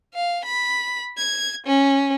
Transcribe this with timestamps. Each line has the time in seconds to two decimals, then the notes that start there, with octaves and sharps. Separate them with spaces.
0.14 F5
0.45 B5
1.17 G#6
1.67 C#4